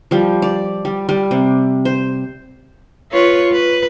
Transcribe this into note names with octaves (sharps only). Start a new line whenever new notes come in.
F3 G3
D5
G3
G3
C3
C5
F4 B4 C#5
B4